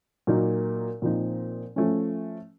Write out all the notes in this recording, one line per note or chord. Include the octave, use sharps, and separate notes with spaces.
A#2 F#3 A#3 D#4 A#4
A#2 F3 C4 D#4
F3 A3 C#4